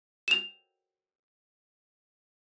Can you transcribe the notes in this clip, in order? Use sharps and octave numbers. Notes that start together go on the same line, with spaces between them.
E7 F7